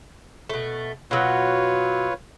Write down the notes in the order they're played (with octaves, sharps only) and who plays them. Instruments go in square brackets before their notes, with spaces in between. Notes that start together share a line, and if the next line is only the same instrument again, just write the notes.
[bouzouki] B2 A3
[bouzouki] B2 F#3 [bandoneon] F4 B4 C#5